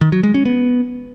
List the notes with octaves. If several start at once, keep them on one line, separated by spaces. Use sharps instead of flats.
D#3
F#3
G#3
C#4
B3